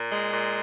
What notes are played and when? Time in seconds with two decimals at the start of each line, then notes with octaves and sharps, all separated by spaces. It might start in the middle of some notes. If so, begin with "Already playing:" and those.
Already playing: A#2
0.10 G#3
0.33 A#2